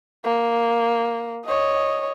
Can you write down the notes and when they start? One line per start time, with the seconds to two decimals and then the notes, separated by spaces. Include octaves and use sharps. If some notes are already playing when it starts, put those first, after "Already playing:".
0.24 A#3
1.46 C#5 D#5